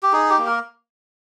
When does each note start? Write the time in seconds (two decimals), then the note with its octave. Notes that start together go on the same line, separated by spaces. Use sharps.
0.03 G4
0.13 D#4 G#4
0.30 G4
0.38 A#3
0.46 A#4